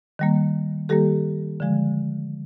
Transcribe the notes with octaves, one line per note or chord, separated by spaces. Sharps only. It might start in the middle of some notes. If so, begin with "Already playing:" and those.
D#3 G3 A#3
D#3 G3 A#3 G4 A4
D3 F3 G#3